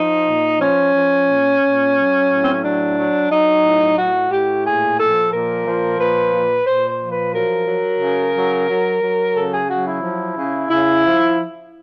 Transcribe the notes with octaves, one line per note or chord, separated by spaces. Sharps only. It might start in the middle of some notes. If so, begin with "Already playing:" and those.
Already playing: F3 D#4
A#2
F3 C#4
F3
A#2
A#2
F#3
A2
C4
C#4
F#3 D4
F#3
F#3 D#4
A2
A2 F#4
A2 G4
A#2 G#4
F3 A4
A#2 A#4
F3
A#2 B4
A#2
A#2 C5
C5
F3
B4
F#3 A#4
F#3
C#3
F#3
F#3
F#3
C#3 A4
G#4
F#3 F#4
E4
F3
C#3
C#3 E4
F3